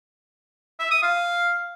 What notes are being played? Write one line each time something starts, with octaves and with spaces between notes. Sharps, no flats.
E5
D#6
F5